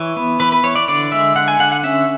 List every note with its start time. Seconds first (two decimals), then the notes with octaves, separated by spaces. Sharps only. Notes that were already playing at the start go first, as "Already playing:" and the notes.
Already playing: E3 C#5
0.17 B3
0.40 E3 B4
0.52 B4
0.64 E3 C#5
0.75 D5
0.88 D3 D5
1.12 G#3 E5
1.36 D3 F#5
1.48 G#5
1.59 D3 F#5
1.72 F#5
1.83 C#4 E5